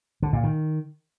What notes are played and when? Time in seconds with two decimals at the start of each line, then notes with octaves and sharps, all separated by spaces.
0.22 D3
0.33 A#2
0.43 D#3